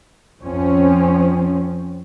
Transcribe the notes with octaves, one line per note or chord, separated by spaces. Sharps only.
F2 F3 C4 C#4